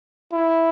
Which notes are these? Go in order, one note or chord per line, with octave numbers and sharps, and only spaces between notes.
E4